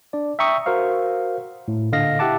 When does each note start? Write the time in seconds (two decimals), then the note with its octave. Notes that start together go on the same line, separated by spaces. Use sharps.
0.13 D4 D5
0.39 E5 G5 A#5 C#6 D#6
0.66 F#4 A#4 C5 F5
1.68 A2
1.92 A#2 D3 D#5 F5 A#6
2.19 E4 G4 E5 F#5 A5 D6